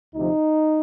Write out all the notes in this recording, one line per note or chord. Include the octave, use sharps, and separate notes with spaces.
D2 C3 F3 D#4